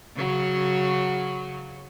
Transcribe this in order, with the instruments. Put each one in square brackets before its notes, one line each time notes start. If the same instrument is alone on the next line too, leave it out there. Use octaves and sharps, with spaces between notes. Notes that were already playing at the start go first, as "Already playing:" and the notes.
[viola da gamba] C#3 F#3